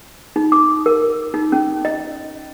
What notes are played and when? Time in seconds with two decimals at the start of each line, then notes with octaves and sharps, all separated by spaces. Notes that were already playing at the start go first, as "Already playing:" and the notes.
0.36 D#4
0.52 D6
0.86 A#4
1.34 D#4
1.52 C#4
1.85 D#5